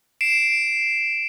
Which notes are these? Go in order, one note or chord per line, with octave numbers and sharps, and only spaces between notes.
C7 D7 E7